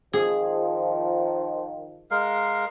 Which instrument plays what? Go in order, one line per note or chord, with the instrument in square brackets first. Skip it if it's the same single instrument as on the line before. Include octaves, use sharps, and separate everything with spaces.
[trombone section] D#3 F3 [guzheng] G#4
[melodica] G#3 A#4 F5